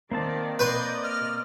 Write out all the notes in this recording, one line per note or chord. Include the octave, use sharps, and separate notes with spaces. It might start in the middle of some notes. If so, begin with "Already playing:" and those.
D#3 A#3 C4 D5 A5
B4 D5 D#5 C6 G6
F6